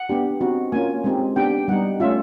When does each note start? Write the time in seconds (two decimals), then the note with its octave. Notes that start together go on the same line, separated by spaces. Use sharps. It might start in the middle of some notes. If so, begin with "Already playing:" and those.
Already playing: F#5
0.09 B3 D4 G4
0.41 C4 D#4 F#4
0.72 A#3 C#4 F4 G#5
1.04 G#3 C4 D#4 G4
1.36 B3 D4 G4 G5
1.68 G3 B3 D#4 F#5
2.00 A3 C#4 F4 E5